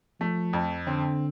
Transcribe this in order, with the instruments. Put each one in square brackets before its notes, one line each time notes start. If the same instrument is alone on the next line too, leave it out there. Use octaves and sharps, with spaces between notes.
[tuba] F3 [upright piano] A3
[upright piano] F2
[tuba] D3 [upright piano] C4